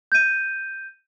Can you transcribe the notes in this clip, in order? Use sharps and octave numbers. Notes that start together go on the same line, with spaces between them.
G6 D#7